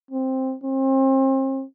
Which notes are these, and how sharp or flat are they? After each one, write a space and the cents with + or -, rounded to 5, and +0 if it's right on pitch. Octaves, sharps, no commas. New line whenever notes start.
C4 +5
C4 +35